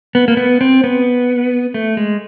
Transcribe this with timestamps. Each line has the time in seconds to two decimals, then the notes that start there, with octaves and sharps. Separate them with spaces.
0.15 B3
0.28 A#3
0.37 B3
0.61 C4
0.84 B3
1.74 A3
1.97 G#3